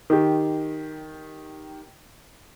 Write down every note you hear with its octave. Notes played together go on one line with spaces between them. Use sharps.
D#3 G4